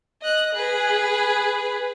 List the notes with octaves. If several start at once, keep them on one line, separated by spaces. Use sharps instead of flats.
D#5 F#6
G#4 B4